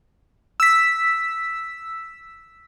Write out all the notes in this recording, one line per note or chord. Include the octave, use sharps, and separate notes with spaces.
E6 B6